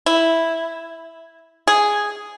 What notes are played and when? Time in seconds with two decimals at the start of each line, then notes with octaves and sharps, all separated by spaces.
0.06 E4
1.67 G#4